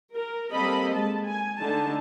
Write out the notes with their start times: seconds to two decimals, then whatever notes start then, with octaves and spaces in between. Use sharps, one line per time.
0.14 A#4
0.52 G3 A#3 C4 A4 D#5 B5
0.94 G#3 A5
1.25 G#5
1.59 D3 A3 D#4 A5